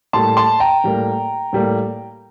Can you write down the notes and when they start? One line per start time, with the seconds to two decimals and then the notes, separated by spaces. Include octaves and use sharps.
0.13 A2 G3 A#3 A5 C6
0.37 A5 C6
0.60 G5 A#5
0.84 A2 G3 A#3
1.53 A2 G3 A#3